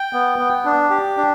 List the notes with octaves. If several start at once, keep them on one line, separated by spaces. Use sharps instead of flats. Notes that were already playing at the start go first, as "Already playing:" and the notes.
Already playing: G5
B3
B3
D4
G4
D4